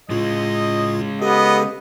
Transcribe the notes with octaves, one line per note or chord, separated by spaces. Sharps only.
A2 C#3 G#3 F4 D#5
B3 G4 A4 D#5